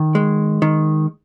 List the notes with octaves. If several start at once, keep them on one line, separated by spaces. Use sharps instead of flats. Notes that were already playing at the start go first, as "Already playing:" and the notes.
Already playing: D#3
G#3
D#3